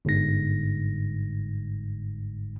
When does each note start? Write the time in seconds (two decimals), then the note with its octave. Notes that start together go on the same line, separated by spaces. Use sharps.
0.05 G1 G#2 A#6